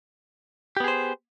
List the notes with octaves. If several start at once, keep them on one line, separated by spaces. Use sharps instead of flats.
B3 G4 G#4 C5